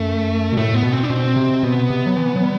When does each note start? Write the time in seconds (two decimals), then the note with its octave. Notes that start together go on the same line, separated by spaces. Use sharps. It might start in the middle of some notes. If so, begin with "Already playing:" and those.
Already playing: F#2 A3
0.53 B2
0.57 A2 A3
0.74 B3
0.83 B2
0.92 C4
1.04 D4
1.10 B2 C4
1.36 C3
1.63 B2 B3
1.90 C3
2.06 F#3
2.16 E3
2.36 F#3
2.43 G3